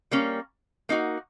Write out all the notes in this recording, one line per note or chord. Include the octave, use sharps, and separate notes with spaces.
G3 A#3 C#4
A#3 D#4 F#4